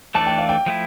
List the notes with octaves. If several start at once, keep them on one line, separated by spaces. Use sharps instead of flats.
E3 A3 D4 A4 D5 A5
G5
F5
G5
F3 A3 E4